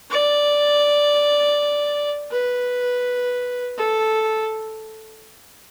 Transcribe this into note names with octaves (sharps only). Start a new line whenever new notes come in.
D5
B4
A4